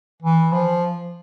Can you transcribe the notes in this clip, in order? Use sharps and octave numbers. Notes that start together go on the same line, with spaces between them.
E3
F3